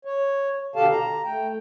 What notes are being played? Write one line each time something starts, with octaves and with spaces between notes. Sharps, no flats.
C#5
B2 D3 G4 A4 F5 A5
A#5
A3 G5